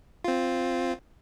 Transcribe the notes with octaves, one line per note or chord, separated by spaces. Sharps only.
C4 F4